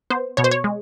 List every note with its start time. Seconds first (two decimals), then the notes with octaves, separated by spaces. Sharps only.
0.10 B3 C5
0.37 B2 C#5
0.44 C5
0.51 C#5
0.64 G#3